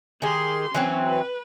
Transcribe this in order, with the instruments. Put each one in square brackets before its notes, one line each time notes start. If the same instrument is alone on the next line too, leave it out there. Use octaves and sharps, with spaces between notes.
[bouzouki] D#3 G#4 [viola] G4 C6
[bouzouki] E3 F#3 C4 [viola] C#4
[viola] B4